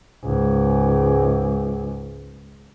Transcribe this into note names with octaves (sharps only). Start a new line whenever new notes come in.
C#2 G#2